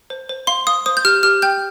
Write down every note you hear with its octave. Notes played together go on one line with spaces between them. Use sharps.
C5
C5
F5 C6
F5 D#6
C5 D#6
G6
G4 F6
G4 F6
G5 G6